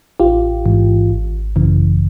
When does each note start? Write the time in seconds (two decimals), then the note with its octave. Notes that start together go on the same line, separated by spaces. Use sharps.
0.20 A1 F4 G4
0.66 G#2 E3
1.10 G#1
1.56 F#2 C#3 E3